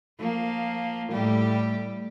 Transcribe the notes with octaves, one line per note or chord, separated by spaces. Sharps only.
F3 A#3
A2 G3 G4